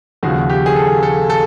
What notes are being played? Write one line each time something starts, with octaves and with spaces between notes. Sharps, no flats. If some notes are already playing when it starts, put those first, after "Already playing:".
D#2 C#3 F3 F#4
G4
G#4
A4
A4
A4